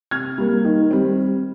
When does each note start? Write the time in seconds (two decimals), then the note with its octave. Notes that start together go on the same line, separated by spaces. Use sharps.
0.11 C3 F6 G#6
0.38 G3 A#3
0.65 D#3
0.91 G3 C4